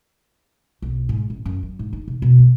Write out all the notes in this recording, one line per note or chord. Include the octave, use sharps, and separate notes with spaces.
B1
G#2
A1
F#2
F#3
G#2
D#4
C3
B2
B3